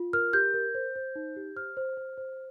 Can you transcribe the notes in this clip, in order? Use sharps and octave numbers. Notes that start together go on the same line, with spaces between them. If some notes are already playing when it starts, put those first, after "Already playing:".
Already playing: F4
A#4 F6
G4 G6
A#4
C5
C5
D#4
G4
C5 F6
C5
C5
C5